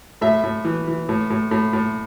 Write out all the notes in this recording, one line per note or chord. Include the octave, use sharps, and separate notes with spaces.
A2 E5
A2
E3
E3
A2
A2
A2
A2